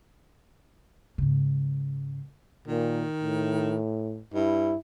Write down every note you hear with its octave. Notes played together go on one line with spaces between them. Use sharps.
G#2 C#3
A#2 D#3
A2
G2 E4